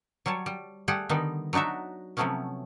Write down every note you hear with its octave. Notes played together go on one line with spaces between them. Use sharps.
F#3 G3 C#5 A5
G3
G3 A3 G4 G#4 F#5
D3 D#3 G3 B3 D#4
F#3 D4 D#4 F#4 E5
C3 F3 F#3 A3 B3 C#4